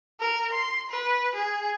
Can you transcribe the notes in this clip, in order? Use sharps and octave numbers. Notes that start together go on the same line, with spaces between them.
A#4
C6
B4
G#4